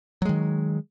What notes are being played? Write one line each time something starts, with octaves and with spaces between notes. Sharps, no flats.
D#3 F#3 G#3